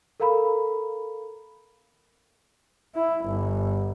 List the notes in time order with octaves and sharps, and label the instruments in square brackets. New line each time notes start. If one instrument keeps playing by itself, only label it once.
[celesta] A4 A#4 F5 A#5 B5
[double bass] E4
G1